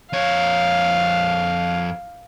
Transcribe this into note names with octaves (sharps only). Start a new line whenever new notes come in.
F2 C#5 F5